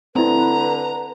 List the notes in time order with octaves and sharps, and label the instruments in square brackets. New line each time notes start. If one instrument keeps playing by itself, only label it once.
[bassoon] D3 [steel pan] C4 E4 [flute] B4 [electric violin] A#5